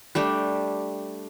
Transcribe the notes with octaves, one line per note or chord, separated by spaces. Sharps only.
G3 A3 D4 G4